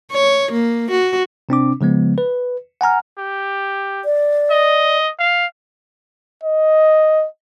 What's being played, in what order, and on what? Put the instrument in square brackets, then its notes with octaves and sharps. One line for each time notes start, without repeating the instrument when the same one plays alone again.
[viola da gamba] C#5
A#3
F#4
[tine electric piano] C3 C4 D4 D6
C#3 F3 G#3 B3
B4
F#5 G#5 A#5 F6
[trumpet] G4
[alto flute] D5
[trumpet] D#5
F5
[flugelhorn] D#5